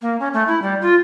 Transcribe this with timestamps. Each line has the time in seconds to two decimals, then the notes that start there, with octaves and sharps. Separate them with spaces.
0.02 A#3
0.20 C#4
0.33 A3
0.47 E4
0.62 G3
0.81 F4